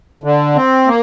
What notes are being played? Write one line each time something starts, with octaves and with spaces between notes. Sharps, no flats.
D3
C4
A#3